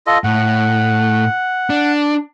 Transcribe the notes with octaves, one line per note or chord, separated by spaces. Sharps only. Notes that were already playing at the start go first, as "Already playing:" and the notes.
F4 A4 D#5
A2 F#5
D4